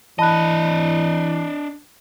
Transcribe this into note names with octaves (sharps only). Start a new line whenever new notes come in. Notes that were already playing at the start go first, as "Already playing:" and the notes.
E3 D4 D#5 A5 B5 F#6